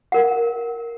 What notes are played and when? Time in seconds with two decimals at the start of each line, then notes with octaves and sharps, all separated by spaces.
0.12 A#4 F#5